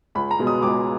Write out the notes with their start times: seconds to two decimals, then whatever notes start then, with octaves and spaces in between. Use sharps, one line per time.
0.15 C#2 B5
0.31 A#5
0.39 B2 G#3
0.47 D#6
0.62 C#2 D6